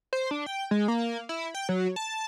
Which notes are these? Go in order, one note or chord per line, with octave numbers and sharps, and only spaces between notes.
C5
D4
G5
G#3
A#3
E4
G5
F#3
A5